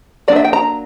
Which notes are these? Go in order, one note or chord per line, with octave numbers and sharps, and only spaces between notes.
F#3 A#3 D4 D5
E5
G5
A#5